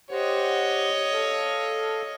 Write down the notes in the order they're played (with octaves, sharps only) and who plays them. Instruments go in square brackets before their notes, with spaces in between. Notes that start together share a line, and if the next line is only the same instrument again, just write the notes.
[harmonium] G4 C5 F#5 [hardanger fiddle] C#5 D#5
[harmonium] A4 F5